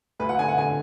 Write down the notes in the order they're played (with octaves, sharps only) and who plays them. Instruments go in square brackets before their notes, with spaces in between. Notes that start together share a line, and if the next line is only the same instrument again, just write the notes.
[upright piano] D2 B4
F#5
D3 G#5
F#5
D3 G#5